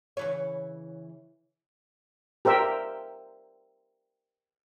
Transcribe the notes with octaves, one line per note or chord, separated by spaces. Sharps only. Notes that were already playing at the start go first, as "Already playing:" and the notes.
C#3 E3 C#5
G4 A#4 C5 E5